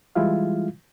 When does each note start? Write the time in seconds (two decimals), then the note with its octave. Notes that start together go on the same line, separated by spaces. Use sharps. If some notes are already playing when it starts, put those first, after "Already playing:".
0.15 E3 G3 G#3 E4 F4 F5